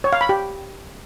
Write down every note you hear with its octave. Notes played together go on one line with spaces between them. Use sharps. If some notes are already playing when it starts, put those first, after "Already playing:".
C#5
F5
B5
G4